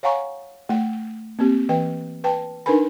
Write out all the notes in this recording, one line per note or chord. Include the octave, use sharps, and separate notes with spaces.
C#5 F5 F#5 G#5 A#5 C#6
A3 F#5
A#3 C4 G4
E3 B4 G5
B4 G5 A5
D4 D#4 A#4 B4 G#5 B5